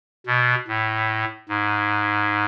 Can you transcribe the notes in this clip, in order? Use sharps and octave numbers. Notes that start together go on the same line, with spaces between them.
B2
A2
G#2